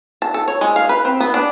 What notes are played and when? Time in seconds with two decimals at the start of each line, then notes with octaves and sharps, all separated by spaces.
0.22 A5
0.34 A4
0.48 C#5
0.61 G#3
0.76 F5
0.89 B4
1.05 C4
1.20 B3
1.34 D4